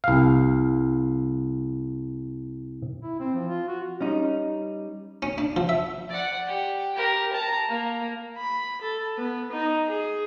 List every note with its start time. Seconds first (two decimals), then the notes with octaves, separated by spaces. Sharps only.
0.04 C2 F5
3.02 E4
3.19 C4
3.34 F3
3.48 F4
3.68 F#4
4.01 G3 C#4 D#4
5.22 C#4
5.38 D4
5.56 F3
5.69 E5
6.10 D5 F#5
6.46 G4
6.95 G4 A#4
7.33 A5 A#5
7.69 A#3
8.38 B5
8.82 A4
9.17 B3
9.52 D#4
9.86 G#4